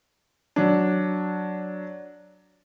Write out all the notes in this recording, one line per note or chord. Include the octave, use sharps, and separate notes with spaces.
F#3 D4